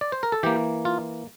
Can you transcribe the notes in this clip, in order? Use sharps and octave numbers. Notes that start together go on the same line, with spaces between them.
D5
C5
A#4
A4
E3 A#3 G4
F4